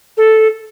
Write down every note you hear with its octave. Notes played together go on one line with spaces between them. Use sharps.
A4